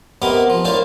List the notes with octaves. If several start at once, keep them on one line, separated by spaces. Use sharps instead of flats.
C3 A#3 B3 D#5 F5 D6
F3
A2 A#3 D4 C5 F5